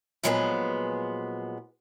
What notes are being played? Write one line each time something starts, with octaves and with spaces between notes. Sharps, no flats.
A#2 F3 F#3 G#3 B3 G#4